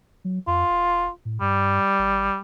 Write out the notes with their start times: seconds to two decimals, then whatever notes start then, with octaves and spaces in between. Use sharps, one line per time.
0.25 F#3
0.47 F2 F4
0.70 D#1
1.25 A2
1.41 G2 G3
1.99 G#1